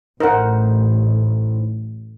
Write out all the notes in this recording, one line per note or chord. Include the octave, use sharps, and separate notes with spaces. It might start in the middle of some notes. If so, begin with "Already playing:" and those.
A1 D#4 A#4 C5 F#5